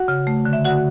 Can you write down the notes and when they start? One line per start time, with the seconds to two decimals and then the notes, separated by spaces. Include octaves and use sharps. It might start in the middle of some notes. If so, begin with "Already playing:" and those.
Already playing: F#4 F#5
0.08 C#3
0.27 A3
0.45 D3
0.53 E5
0.65 D3 F#4 F#5